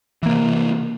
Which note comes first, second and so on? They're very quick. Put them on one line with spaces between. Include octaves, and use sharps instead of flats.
E3 A#3 C3